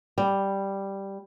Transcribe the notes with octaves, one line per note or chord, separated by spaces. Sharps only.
G3